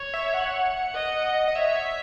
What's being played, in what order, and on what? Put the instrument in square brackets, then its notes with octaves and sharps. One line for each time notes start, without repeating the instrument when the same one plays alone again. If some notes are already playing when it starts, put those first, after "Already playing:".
Already playing: [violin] C#5
[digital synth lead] E5
F#5
[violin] D#5
[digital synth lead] D#5
[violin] C#5 [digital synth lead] E5